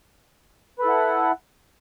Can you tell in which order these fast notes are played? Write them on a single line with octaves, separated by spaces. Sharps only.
B4 A4 E4 F#5